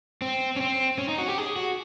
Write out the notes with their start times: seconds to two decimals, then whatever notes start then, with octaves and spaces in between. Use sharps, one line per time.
0.22 C4
0.56 C#4
0.61 C4
0.98 C#4
1.09 D#4
1.19 F#4
1.28 G4
1.38 G#4
1.56 F#4